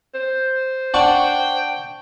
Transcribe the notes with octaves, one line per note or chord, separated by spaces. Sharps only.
C5
D4 F#5 G5 C#6